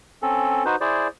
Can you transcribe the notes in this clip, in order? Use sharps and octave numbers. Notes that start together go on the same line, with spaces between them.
C4 C#4 A4
D#4 F#4 B4 C5
E4 G#4 C5 D5